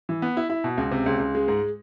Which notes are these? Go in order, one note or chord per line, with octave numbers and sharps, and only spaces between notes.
E3
B3
E4
E4
B2
C#2
C3
C#2
C#2
G#3
G#2